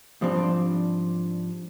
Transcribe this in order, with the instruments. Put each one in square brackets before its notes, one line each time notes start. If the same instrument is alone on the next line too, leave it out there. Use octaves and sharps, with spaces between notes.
[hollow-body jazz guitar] G#2 F3 G3 C4 D4